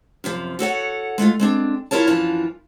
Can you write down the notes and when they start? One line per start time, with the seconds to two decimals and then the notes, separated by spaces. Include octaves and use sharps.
0.24 F#2 C3 F3
0.59 F#4 A4 C#5 F#5
1.18 G#3 A3 C#4 F4
1.40 G#3 C4 D4
1.91 F#2 E4 F4 A#4 C#5 A5
2.07 F#2 E3 F3 D4 F4 A5